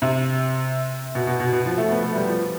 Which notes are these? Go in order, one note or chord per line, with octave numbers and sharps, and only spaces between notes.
C3
B2
B2
B2
B2
F3
A3
B3
A3
G3
F3